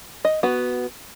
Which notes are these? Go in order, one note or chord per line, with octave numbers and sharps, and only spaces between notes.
D#5
B3 F#4